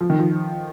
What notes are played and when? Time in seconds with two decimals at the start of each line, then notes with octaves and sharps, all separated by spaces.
0.01 F3
0.10 D#3
0.19 F3